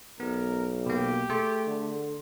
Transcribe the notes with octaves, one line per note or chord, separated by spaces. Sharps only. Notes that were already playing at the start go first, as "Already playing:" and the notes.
B1 B3 A#4
B2 A#3 G4
A3 G#4 C6
D3